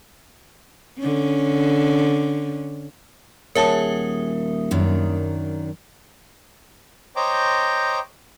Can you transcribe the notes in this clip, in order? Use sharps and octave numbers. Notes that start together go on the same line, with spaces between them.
D3 C#4
D#1 G#4 A#4 C#5 E5 F#5 A5 D#6
F#2 D#3 D4
C5 C#5 D#5 G5 A#5 D6